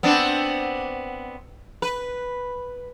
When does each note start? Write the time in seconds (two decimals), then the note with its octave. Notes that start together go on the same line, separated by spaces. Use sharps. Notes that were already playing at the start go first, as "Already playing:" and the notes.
0.03 B3 C4 D4
1.82 B4